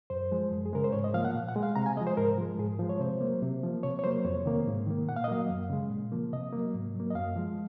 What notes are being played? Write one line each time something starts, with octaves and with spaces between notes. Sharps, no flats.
F#2 C5
F3 G#3
F#2
G#4
C#3 G#3 A#4
C5
G#2 C#5
D#5
F3 A#3 F5
F#5
A#2
F#5
G#3
F5
C3 A#5
G#5
F3 G#3 D#5
C5
G#2 A#4
F3 G#3
G#2 G#4
F3 G#3
C#5
C3 C5
F#3 A#3
C3
F3 A#3
C3 C#5
C#5
F#3 A#3 C5
F2 C#5
C3 D#3 A#3
G#2
D#3 A#3
A#2 F#5
F5
D#5
F#3 A#3 F5
F#2
C#3 G#3
A#2
F3 A#3
C3 D#5
F#3 A#3
G#2
F#3 A#3
D#5
F#2 F5
F3 G#3